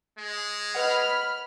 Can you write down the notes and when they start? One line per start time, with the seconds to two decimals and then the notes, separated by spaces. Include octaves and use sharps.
0.18 G#3
0.75 B4 D#5 F#5 B5 F6